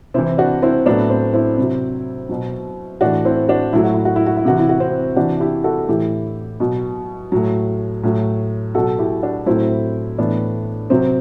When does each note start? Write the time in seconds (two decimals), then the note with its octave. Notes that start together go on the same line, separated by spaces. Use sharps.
0.14 C3 E3 C4 E4
0.38 D4 F#4
0.62 C4 E4
0.86 A2 F#3 B3 D4
1.10 C4
1.34 C4 E4
1.58 C3 F#3
2.29 B2 F#3
3.01 A2 E3 D4 F#4
3.25 C4 E4
3.49 D4 F#4
3.73 A2 F#3 E4
3.84 F#4
3.94 E4
4.05 F#4
4.16 E4
4.26 F#4
4.37 E4
4.45 C3 E3 F#4
4.59 E4
4.69 F#4
4.80 C4 E4
5.16 C3 E3 D4 F#4
5.40 E4 G4
5.64 F#4 A4
5.88 A2 E3 E4 G4
6.60 B2 F#3
7.32 A2 F#3
8.03 A2 F#3
8.75 B2 F#3 F#4 A4
8.99 E4 G4
9.23 D4 F#4
9.46 A2 F#3 C4 E4
10.18 A2 E3 B3 D4
10.90 C3 F#3 C4